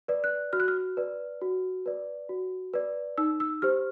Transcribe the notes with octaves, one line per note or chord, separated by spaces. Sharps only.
B4 D5
F#6
F#4 F6
F#6
F6
B4 D5
F#4
B4 D5
F#4
B4 D5
D#4 E6
E6
G4 C5 F6